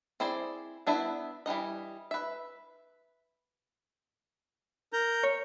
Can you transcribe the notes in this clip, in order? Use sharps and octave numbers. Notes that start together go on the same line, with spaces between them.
C4 E4 G#4 C5 D5
B3 D4 E4 B4 E5
E3 G3 D#4 D#5
B4 E5
A#4 A#5 G6
C#5